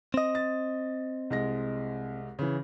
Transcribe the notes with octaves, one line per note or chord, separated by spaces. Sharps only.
C4 D#5
A6
C2 G#3 A#6
C#3 E3